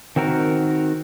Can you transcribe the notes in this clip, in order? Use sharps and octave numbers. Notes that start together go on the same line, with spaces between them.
D#3 C4 F#4 A#4